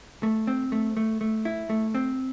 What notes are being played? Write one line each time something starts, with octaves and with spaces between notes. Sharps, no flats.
A3
C4
A3
A3
A3
E4
A3
C4